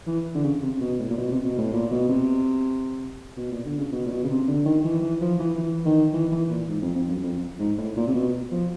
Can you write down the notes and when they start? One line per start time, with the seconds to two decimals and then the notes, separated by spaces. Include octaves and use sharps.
0.07 E3
0.35 D3
0.44 C#3
0.62 C3
0.81 B2
0.99 A2
1.10 A#2
1.17 B2
1.31 C3
1.44 B2
1.58 A2
1.73 A#2
1.91 B2
2.09 C3
3.37 B2
3.51 A#2
3.65 D3
3.78 C#3
3.93 B2
4.06 A#2
4.11 B2
4.23 C#3
4.29 C3
4.47 D3
4.65 D#3
4.84 E3
5.02 E3
5.21 F3
5.39 E3
5.58 E3
5.85 D#3
6.13 E3
6.31 E3
6.50 A#2
6.68 G#2
6.82 F2
6.95 F2
7.09 F#2
7.23 F2
7.59 G#2
7.78 A2
7.96 A#2
8.07 C3
8.14 B2
8.51 F3